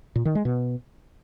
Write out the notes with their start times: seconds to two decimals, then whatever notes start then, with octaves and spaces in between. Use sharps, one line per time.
0.16 A#2
0.25 D#3
0.35 G#3
0.45 B2